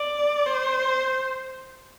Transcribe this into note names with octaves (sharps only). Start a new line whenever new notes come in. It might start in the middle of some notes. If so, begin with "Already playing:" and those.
Already playing: D5
C5